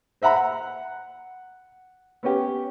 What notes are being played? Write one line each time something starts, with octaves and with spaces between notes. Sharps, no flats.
C5 E5 F#5 A#5 B5
F#5
B3 C#4 G4